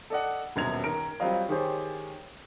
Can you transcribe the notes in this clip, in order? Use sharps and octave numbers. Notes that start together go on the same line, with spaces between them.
A4 D5 D#5 F#5
D#1 F#2 B2 G#6 F7
D#3 A#4 A#5 D7
F#3 G3 C4 F4 D#5 F5
D#3 G4 G#4 C5 C#5